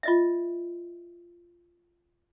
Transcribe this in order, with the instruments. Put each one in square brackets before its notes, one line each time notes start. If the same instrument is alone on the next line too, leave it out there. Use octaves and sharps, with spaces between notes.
[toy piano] F4 D#5 E5